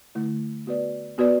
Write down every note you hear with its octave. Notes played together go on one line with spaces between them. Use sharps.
D3 A3 E4
B3 F#4 B4 D5
B3 F#4 B4 D5